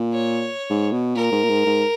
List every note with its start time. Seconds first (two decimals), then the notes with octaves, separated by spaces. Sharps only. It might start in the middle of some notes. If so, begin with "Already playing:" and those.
Already playing: A#2
0.13 C#5
0.70 G#2
0.92 B2
1.16 A#2 A#4
1.32 G#2
1.44 A#2
1.49 G#2
1.66 G#2